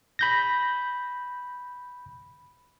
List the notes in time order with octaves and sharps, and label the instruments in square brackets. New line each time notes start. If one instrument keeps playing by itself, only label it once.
[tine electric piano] B5 G6 A#6